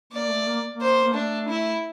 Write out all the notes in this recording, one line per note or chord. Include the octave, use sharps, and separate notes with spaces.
A#3 D5
A3
A#3
A#3
C5
A#3
A3 D4
E4